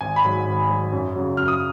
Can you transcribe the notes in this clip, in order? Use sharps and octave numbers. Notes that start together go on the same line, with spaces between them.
G#1 G#5
B5
G#2 F#3
G#1
G#2 F#3
F#2
C#3 F#3
F#2 F6
D#6